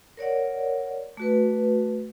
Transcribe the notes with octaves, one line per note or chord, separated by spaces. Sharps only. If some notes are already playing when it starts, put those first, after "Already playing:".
A#4 C#5 D5 F#5
A3 F#4 B4